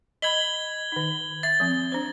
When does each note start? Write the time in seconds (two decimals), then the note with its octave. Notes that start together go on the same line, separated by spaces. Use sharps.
0.22 D#5 B5 G#6 F#7 G7
0.92 D#3 D#4
1.43 E5 A6
1.60 F3 C4
1.92 D4 C5